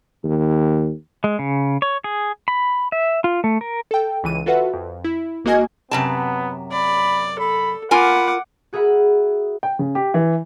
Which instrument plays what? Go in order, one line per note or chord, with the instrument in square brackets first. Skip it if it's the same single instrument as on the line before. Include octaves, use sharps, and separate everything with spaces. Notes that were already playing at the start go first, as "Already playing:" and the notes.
[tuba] D#2
[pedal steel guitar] G#3
C#3
C#5
G#4
B5
E5
F4
A3
A#4
[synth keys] A4 G5
C#2 E3 D#7
F4 F#4 A4 B4 E5 F#5
F2
E4
G#1 A#3 F#4 D#5 G#5 G#6
[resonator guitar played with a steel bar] F#2 C3 A5 [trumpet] B3
[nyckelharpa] D5 [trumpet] B5
[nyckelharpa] A4 [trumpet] B5
[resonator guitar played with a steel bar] F4 A#4 G#5 [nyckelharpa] F#5 D6 [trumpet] B5
[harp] F#4 G#4 A#4 E5 F#5 B5
[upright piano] G5
C#3
G4
E3